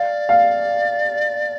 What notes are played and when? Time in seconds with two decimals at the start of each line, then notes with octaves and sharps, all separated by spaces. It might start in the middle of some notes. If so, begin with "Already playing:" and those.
Already playing: D5 F5
0.29 F5